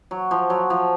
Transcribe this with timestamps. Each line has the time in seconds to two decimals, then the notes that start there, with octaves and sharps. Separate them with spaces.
0.11 F#3
0.31 F3
0.50 F#3
0.70 F3